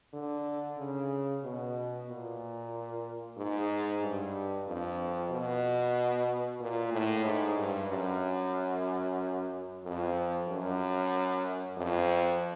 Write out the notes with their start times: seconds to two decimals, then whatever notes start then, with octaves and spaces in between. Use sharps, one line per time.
0.14 D3
0.78 C#3
1.44 B2
2.08 A#2
3.37 G#2
4.02 G2
4.67 F2
5.30 B2
6.60 A#2
6.92 A2
7.25 G#2
7.58 G2
7.90 F#2
9.84 F2
10.48 F#2
11.77 F2